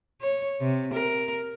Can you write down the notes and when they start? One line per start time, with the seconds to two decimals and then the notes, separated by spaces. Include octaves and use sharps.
0.22 C#5
0.61 C3
0.94 A#4